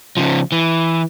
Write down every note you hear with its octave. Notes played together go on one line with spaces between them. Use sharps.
C#3 F3
E3